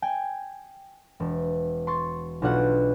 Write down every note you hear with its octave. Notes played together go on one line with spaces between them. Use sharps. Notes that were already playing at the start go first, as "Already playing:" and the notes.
G5 G#5
E1
C6 C#6 A6
B1 B2 D4 F4 F#5